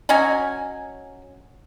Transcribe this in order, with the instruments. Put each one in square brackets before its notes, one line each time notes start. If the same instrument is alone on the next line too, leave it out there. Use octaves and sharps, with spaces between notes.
[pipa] F#3 C#4 D#5 G#5